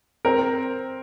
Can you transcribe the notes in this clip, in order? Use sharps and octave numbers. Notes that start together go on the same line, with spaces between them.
C4 A#4